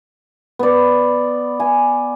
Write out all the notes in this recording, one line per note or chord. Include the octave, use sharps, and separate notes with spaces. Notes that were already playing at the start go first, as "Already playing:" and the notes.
B3 D5
G#5